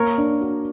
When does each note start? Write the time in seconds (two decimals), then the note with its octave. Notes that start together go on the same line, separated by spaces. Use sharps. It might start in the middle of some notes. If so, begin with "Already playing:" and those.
Already playing: A#3 A#4 C#5
0.18 D4
0.41 F#4